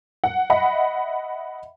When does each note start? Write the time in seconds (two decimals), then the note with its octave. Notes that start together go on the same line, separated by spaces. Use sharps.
0.24 F#5
0.50 D#5 E5 F#5 B5